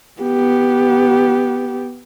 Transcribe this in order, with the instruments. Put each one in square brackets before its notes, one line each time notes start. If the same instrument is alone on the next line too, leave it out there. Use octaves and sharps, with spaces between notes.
[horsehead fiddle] B3 G4